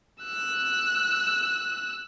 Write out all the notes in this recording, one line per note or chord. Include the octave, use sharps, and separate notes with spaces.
E6 F#6